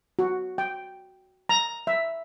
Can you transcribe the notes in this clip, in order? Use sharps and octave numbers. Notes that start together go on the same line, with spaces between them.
F#4
G5
A#5
E5